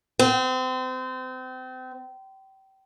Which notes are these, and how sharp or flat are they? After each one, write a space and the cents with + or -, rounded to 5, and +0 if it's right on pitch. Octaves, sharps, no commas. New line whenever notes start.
C4 -30